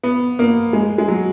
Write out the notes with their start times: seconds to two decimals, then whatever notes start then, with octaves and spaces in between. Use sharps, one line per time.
0.03 B3
0.39 A#3
0.73 G#3
0.98 G#3
1.08 F#3